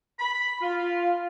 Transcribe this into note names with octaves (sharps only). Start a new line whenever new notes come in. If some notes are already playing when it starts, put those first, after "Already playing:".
B5
F4